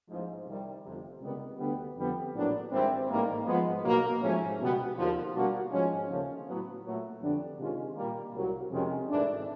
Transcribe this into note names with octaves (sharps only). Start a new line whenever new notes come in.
A1 G#2 F3
C2 C3 D#3 G3
G1 F2 C3
C#2 C3 D#3 G3 B3
D2 D3 G3 B3
F2 D3 G3 B3
A#1 A2 F#3 B3 D4
G#1 G2 E3 G3 C4
A1 G#2 D#3 G3 A#3
G#2 F3 G#3 B3
B1 B2 F#3 A#3
G#2 F3 A3 C#4
C#2 B2 G3 B3
D#2 D3 F3
B2 G3 A#3 D4 F#4
G#2 F3 G#3 C#4
D#2 C#3 F3 A3 C#4
A2 F#3 B3
A#2 F#3 A3
F2 D3 G3 B3 D4
C3 D#3 G#3 C#4 F4
A#2 G3 A#3
C2 A#2 F#3
F2 C3 D#3 G#3 C#4
G#1 G#2 E3 A3 D4